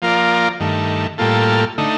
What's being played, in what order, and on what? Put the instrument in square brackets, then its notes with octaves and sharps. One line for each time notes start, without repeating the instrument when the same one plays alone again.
[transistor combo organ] F3 A#3 F4 A#4 D5
G2 D#3 A3
A2 G3 A#3 F4 A4
D3 A3 D#4